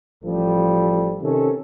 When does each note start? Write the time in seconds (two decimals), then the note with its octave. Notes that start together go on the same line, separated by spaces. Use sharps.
0.24 A1 F3 G3 A4
1.21 C3 D#3 C#4 A4